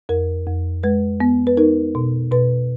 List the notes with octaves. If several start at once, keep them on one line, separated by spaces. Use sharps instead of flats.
F2 A#4
F2
G#3 B4
B3
B4
D#4 A#4
B2
B2 B4